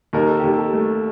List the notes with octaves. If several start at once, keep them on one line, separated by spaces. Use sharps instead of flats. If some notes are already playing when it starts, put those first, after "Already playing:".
D#2 A#4
A4
D#2 G4
A4
A3